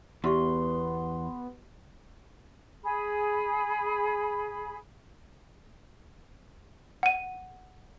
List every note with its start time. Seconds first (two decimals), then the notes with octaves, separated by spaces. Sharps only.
0.24 E2 B3 E4 G4 C6 C#6
2.83 G#4 B5
7.03 F#5 D#7